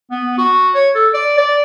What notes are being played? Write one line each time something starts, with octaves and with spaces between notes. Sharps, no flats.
B3
F#4
C#5
A4
D5
D5